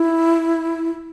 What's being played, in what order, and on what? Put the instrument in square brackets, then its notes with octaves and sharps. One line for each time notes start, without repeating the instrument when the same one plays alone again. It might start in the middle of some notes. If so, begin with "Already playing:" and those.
Already playing: [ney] E4